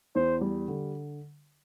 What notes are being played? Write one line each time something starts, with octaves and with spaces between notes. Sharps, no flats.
E2 C5
G3
D3